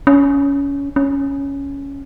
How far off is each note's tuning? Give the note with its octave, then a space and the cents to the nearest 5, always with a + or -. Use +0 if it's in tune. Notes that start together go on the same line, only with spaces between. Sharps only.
C#4 +20
C#4 +5